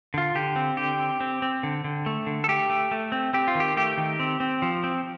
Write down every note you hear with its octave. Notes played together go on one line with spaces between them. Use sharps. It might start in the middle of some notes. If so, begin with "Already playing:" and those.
D3 F4
D3 G4
C4
D3 G4
C4
C4
C4
D3
D3
A3
D3
A4
A3 G4
A3
A3
C4
C4 G4
F4
D#3 G4
A3 G4
D#3
C4
C4
F3
C4